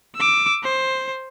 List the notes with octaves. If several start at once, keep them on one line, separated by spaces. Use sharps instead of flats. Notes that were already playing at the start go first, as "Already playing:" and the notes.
D6 E6
C5